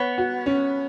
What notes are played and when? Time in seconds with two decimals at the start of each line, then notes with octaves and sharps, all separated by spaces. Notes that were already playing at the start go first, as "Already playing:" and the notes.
Already playing: B3 C#5
0.18 F#4
0.46 C#4